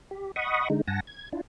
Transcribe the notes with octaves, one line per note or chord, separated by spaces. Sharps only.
G4
D#5 F#5 B5 C#6 D#6
D3 G#3 D#4
G2 F#5 G#5 A5 A#6
G#6
D4 E4 F4